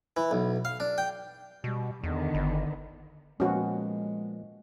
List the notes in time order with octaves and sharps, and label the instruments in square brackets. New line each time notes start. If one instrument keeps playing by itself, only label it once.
[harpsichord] E3
B1
F5
D4
G5
[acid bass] B2 [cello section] G3
[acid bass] E2 [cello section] D3 D#3 B3
[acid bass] G1
[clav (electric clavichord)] A#2 F3 B3 [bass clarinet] G#3 [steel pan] C#4 F#4